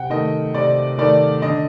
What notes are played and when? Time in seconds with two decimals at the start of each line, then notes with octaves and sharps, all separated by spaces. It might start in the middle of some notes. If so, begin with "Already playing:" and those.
Already playing: C3 F#5 G5
0.10 D#3 A3 D#5
0.54 C3 D5
0.98 D#3 A3 D5
1.42 D3 D#5